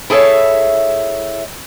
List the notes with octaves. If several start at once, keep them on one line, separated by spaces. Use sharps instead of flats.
E4 G#4 A4 C#5 E5